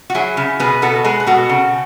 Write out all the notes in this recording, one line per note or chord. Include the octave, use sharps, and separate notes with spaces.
F#4
F#3 E4 G#4
C#3
B2 G#4 B4
B2 F#4 A4
G#3 G#4 B4
B4
B2 F#4 A4
C#3